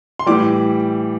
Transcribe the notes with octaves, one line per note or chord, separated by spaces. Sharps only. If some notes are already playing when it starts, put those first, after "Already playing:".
C6
A2 E3 G3 D6